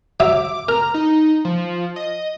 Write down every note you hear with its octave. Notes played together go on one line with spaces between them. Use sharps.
F#3 E5 D6
A#4 A#5
D#4
F3
D#5